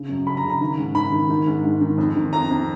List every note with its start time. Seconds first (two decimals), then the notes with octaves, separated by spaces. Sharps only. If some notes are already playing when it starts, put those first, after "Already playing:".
Already playing: C#3
0.09 F#2
0.26 C#3 B5
0.37 A#5
0.44 C#3
0.50 A#5
0.61 D#3
0.77 G#2
0.95 D#3 B5
1.12 D#3
1.30 D#3
1.47 G#2
1.64 G#2
1.81 D#3
1.98 F2
2.16 D#3
2.33 F2 A#5
2.50 F2